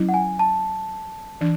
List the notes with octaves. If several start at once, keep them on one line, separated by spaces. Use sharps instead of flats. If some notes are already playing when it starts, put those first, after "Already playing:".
Already playing: F#3 C#4 E4
F#5
G#5
A5
E3 D4